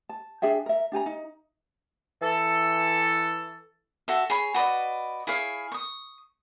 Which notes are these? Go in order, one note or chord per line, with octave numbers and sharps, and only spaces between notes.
A5
D4 G#4 E5 G5
A#4 E5
D4 G4 G#5 A#5
D#4
E3 A4
F#4 A4 E5
G#4 C#5 B5
F#4 B4 D5 D#5
E4 G#4 C#5 F5
C#6 D#6